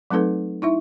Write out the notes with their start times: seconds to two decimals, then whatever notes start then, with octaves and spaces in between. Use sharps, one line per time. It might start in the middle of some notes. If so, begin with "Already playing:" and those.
0.11 F#3 A3 C4 D#4 A4 B4
0.62 D#4 E4 E5